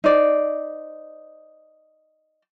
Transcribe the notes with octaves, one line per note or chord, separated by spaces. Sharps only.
D#4 C5 D5